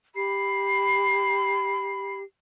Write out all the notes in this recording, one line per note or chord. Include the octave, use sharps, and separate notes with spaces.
G4 B5 C7